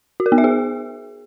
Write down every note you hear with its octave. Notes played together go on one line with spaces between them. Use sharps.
F#4
A#4
B3
E5
G#4